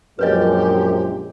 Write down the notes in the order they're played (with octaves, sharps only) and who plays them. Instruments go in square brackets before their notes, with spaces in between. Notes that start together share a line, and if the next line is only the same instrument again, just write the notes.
[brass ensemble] A#1 F3 G#3 [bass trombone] F#2 [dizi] G4 [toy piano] B4 C#5 D#5